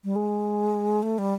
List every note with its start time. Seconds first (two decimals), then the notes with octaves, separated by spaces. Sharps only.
0.04 G3
0.16 G#3
1.03 A3
1.18 G3